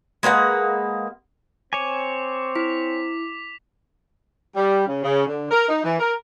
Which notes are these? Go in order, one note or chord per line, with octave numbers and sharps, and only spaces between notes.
G#3 A#3 B4 F#5
C4 C#5 G#5 D6
E4 B6 F7
G3
C#3
C#3
D3
A#4
D#4
E3
A#4